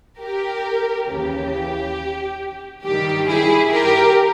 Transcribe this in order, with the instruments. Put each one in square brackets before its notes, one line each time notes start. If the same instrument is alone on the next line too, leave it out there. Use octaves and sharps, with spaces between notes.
[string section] G4 A#4
D#2 C#3 E3 G4
G2 D#3 G3 G4
E4 G#4
G4 A#4